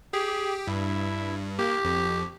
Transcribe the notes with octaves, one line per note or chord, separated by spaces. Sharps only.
G4 G#4
G2 E4
A#3 G4
F2